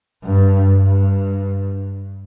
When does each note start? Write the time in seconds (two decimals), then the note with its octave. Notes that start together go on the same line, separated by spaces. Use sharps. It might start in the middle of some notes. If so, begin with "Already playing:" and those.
0.24 G2
0.70 G2